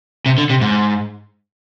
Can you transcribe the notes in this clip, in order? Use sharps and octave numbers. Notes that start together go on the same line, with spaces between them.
C3
D3
C3
G#2